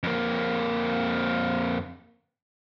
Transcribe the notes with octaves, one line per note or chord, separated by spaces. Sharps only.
F2 A#3